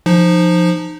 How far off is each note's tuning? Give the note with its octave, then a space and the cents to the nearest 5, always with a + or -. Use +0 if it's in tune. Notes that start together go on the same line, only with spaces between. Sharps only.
F3 +0 D#4 -20